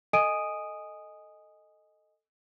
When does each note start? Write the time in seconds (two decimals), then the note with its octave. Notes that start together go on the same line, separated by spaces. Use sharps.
0.13 A4 D#5 G#5 D#6 D7 D#7